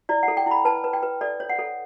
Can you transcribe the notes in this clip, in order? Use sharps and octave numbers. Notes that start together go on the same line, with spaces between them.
E4 D5
F#5
A4
G5
E4 B5
B4 A5
B4
G5
B4
A4 D5
C#5
F#5
A4